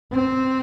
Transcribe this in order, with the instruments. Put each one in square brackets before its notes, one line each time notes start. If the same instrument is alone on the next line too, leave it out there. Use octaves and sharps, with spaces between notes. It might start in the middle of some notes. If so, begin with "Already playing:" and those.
[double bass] C4